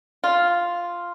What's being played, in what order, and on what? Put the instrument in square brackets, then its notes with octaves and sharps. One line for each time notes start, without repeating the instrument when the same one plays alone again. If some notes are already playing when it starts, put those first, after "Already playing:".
[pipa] F4